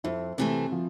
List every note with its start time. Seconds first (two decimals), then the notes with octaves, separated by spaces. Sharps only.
0.04 F2 E4
0.38 C3 E3 A3 C4
0.72 F3